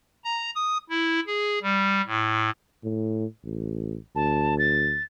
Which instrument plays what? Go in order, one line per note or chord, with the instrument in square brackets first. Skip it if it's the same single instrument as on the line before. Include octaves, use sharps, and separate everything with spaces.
[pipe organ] A#5
D#6
E4
G#4
G3
A2
[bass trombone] A2
A1
[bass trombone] D2 [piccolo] A5
[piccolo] A6